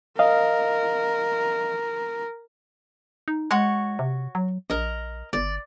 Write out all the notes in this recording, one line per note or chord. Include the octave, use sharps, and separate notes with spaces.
A#4 D#5 F5
D#4
G#3 F#4 C#5
C3
F#3
A#1 A#4 D#5
G1 D5